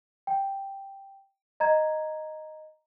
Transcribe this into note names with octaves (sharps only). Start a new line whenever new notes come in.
G5
D#5 A#5 G#6